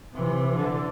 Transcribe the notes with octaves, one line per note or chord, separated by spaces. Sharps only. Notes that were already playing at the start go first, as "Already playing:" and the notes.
C3 E3
D3